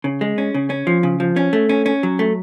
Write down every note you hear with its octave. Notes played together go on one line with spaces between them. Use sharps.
C#3
G#3
C#4
C#3
C#4
F3
C#3
F3
C#4
A3
C#4
C#4
F#3
A3